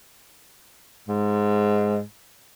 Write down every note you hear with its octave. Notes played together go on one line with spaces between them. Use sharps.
G#2